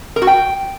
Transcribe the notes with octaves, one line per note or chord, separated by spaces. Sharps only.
A#4
F#4
G5